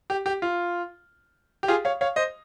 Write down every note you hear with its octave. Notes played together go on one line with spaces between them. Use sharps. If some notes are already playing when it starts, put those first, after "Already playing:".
G4
G4
F4
G4
F4 G#4
C#5 F5
C#5 F5
C5 D#5